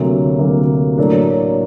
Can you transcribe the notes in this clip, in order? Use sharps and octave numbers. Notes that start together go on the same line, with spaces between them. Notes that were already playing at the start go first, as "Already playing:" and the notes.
Already playing: D2 C3 F#3 A#3
D2 C3 F#3 A#3
A2 F#3 A#3 D4